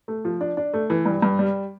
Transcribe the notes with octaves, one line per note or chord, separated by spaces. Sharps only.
A3
F3
D4
D4
A3
E3
G2
G2
G3